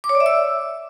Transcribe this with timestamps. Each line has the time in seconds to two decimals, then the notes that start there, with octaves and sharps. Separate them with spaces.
0.04 D6
0.09 C#5
0.15 D5
0.20 E5
0.26 E6